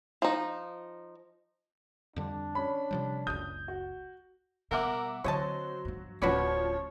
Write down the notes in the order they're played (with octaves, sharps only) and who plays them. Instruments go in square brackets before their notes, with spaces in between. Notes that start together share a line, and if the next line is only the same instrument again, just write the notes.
[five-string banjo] F3 D#4
[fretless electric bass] F2 D3 G3 [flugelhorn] D4
[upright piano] C#4 B5
[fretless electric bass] C3 F3 G3
[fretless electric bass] F#1 C#2 [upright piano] D#6 G6
[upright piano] F#4
[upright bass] B2 G3 [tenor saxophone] A#4 [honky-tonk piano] E5 F#5 D6
[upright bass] D3 C4 [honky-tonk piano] F#3 F#4 [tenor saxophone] C5 [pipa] C#5 D#5 A5
[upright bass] G2 F3
[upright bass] D1 [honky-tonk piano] F3 C#4 [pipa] F#4 B4 D5 [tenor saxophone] C#5